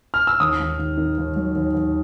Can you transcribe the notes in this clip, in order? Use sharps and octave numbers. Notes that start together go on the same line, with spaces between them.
F6
E6
D#2 D#6
D#2
D#2
D#3
D#2
F#3
D#2
D#2